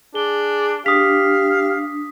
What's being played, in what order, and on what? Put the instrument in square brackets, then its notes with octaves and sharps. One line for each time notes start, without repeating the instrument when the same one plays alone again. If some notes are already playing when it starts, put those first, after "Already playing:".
[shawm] D4 [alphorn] G#4 [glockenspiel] G7
[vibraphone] D4 [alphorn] G4 [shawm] F5 [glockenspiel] D#6 B6